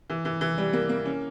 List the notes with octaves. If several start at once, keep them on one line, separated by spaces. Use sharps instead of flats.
E3
E3
E3
G3
A#3
A#3
C#4